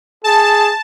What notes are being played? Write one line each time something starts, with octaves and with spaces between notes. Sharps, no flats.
G#4 A5